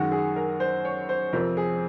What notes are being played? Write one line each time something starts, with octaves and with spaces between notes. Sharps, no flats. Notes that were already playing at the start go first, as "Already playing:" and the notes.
Already playing: F#2 D#3 G#3 F#4
G#4
A#4
C5
C#5
C5
F2 C3 F3 C4 A#4
G#4